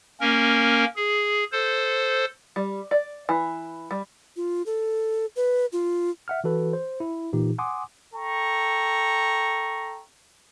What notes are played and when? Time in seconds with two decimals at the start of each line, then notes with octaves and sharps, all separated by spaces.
0.21 A#3 C#4 A#4
0.96 G#4
1.52 A4 C5
2.56 G3
2.91 D5
3.29 E3
3.91 G3
4.36 F4
4.66 A4
5.36 B4
5.72 F4
6.28 E5 F#5 F6
6.44 E3 F#4 A4 B4
6.73 C5
7.00 E4
7.33 A#2 E3 D#4 G4
7.58 F#5 G#5 C6 D6 D#6
8.15 A4 G5 A#5 C#6